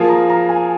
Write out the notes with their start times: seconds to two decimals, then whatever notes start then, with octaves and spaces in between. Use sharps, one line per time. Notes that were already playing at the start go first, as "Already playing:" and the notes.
Already playing: F3 A#3 F4 G#4
0.09 A#5
0.30 A#5
0.49 G#5